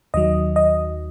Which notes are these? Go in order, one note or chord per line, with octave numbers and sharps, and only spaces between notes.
D#2 D#3 F#3 D#5
D#5